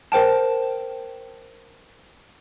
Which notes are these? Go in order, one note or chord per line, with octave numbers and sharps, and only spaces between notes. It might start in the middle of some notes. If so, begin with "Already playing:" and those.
A#4 C5 G5 A5